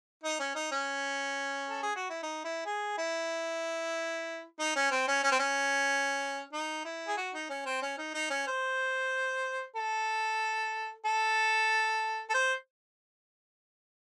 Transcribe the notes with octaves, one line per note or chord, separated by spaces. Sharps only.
D#4
C#4
D#4
C#4
A4
G#4
F#4
E4
D#4
E4
G#4
E4
D#4
C#4
C4
C#4
C#4
C4
C#4
D#4
E4
G#4
F#4
D#4
C#4
C4
C#4
D#4
D#4
C#4
C5
A4
A4
A4
C5